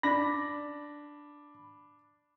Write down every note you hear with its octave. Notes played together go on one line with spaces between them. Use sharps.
D4 B5 A#6